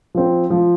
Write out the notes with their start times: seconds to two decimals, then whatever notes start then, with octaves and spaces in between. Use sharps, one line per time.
0.15 F3 C4
0.50 F3